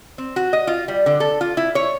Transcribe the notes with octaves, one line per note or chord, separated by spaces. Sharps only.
C4
F#4
D#5
F4
G3
D3
A4
F4
E4
C#5